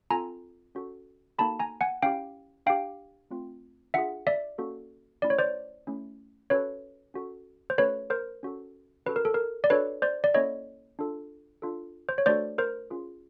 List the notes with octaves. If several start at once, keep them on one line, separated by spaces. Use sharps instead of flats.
C4 F4 A4 G#5 A#5
C#4 F#4 A4
A#3 D#4 F#4 A4 A5 B5
G#5 A#5
F#5 G#5
C#4 E4 G4 F5 G5
D4 G4 F5 G5
A3 C4 F4
D4 F4 G#4 E5 F#5
D5 E5
A#3 C#4 F#4 A4
A3 C#4 E4 D5
C#5
C5 D5
A3 C#4 E4
C#4 F#4 A4 B4 C#5
C#4 F#4 A4
C5
A3 C#4 F#4 A4 B4 C#5
A#4 C5
C#4 F#4 A4
C#4 F#4 A4 B4
A#4
A4
A#4
D5
D4 F#4 A4 B4 C#5
C5 D5
D5
A#3 C#4 E4 A4 C#5 D#5
D4 F4 A4
D4 F4 A4
C5
C#5
A3 D4 F#4 A4 C5 D5
A#4 C5
C#4 F4 G#4